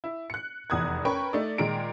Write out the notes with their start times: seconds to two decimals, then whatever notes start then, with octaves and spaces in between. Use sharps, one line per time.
0.04 E4
0.30 F#6 C#7
0.70 F1 E2 D#6 F#6 G#6
1.05 C#4 A#4 B4 G5 B5 C#6
1.33 A3 D#4 D5
1.58 A#2 D#3 G#3 A#5 D7